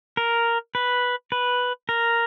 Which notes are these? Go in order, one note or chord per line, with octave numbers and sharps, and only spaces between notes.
A#4
B4
B4
A#4